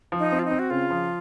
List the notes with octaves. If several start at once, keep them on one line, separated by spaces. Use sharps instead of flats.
F3
D#4
C4
F4
D#4
C4
F#4
C#3 F4
F3